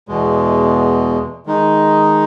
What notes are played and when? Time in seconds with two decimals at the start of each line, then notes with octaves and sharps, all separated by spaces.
0.08 E2 B2 G#3
1.46 D#3 G#3 D#4